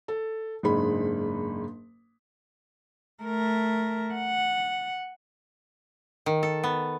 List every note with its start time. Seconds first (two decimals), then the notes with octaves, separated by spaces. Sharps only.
0.08 A4
0.63 F#1 G#2 D4 G#4 B5
3.23 A3 A#4
4.14 F#5
6.26 D#3
6.43 A4
6.64 B3